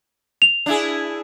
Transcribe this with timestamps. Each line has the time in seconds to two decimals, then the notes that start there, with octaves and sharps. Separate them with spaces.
0.42 F7
0.66 D4 E4 G#4